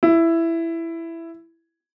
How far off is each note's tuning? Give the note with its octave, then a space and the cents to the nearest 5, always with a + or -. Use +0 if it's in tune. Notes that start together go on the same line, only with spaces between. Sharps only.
E4 +10